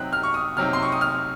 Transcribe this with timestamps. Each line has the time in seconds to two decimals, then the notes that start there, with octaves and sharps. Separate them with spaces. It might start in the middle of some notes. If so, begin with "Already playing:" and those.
Already playing: C3 F#3 C4 D#4 F#6
0.13 F6
0.23 C#6
0.34 D#6
0.57 C3 F#3 C4 D#4 F6
0.73 C6
0.82 C#6
0.92 D#6
1.01 F6